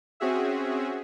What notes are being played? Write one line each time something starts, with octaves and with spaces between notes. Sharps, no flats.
C4 C#4 F#4 G#4 E5